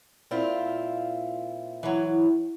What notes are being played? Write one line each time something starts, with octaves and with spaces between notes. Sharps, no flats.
A#2 C4 E4 F4
E3 F#3